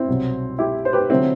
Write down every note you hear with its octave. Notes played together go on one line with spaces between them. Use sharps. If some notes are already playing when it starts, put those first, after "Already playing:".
Already playing: C4 E4
C2 B2 F#3
E4 G4
C5
G4 B4
D3 F#3 C4 E4